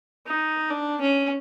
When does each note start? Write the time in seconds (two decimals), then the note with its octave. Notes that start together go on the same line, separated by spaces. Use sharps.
0.26 D#4
0.70 D4
1.01 C#4